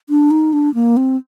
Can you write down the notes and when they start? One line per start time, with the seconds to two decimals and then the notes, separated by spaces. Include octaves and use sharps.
0.09 D4
0.31 D#4
0.53 D4
0.75 A#3
0.97 C4